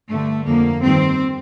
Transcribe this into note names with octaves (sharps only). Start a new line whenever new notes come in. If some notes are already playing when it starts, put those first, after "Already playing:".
G2 D3 A3
F2 D3 A#3
G2 D#3 C4